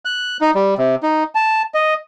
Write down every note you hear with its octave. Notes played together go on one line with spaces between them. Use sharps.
F#6
D#4
G3
C3
D#4
A5
D#5